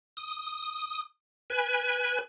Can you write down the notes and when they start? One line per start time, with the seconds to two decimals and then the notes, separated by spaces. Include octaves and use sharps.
0.17 D#6
1.50 B4 G#5